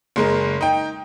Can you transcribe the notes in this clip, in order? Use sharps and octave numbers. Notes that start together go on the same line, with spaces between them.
F#1 G#3 A#4
D#4 G5